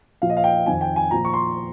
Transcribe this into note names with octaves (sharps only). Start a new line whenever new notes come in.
A#2 F3 F5
D#5
F5
G5
F2 D#3 G#5
G5
G#5
A#2 F3 A#5
C#6
C6